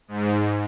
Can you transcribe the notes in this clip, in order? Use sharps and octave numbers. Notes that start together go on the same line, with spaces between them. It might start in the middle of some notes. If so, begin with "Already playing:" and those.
G#2